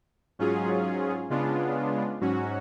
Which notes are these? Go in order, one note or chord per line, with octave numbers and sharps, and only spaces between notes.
G#2 F#3 C#4 F4 G#4
C#3 G#3 B3 D4 F4
G#2 F#3 C#4 F#4